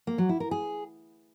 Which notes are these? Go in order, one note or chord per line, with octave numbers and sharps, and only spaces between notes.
A#3
F#3
E4
A#4
G#4